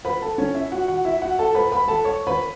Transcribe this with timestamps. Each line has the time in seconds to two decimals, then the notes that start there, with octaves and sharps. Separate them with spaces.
0.05 B4 B5
0.22 A4 A5
0.38 C#4 C#5
0.55 E4 E5
0.72 F#4 F#5
0.88 F#4 F#5
1.05 E4 E5
1.22 F#4 F#5
1.39 A4 A5
1.54 B4 B5
1.72 B4 B5
1.88 A4 A5
2.05 C#5 C#6
2.27 B4 B5